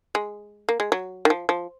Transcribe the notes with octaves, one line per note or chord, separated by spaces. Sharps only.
G#3
A#3
G#3
F#3
D#3
F3
F3